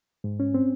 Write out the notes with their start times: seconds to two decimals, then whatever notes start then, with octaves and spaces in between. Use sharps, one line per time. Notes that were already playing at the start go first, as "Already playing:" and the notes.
0.24 G#2
0.40 C#4
0.54 C4